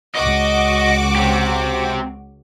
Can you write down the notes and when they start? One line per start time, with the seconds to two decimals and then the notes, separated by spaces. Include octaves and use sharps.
0.16 C#2 F#4 D#5 D6
1.15 C4 G4